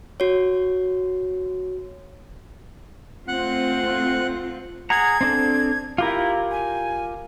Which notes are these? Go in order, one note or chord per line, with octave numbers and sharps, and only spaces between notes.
F#4 C#5
A3 C4 F4 F#5 F#6
G#4 F#5 A#5 G#6
C4 D4 A4
E4 F4 G4 A#4
G#5